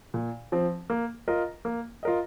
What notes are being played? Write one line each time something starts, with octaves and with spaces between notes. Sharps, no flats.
A#2
F3 C4
A#3
F4 A#4 D#5
A#3
F4 A#4 D#5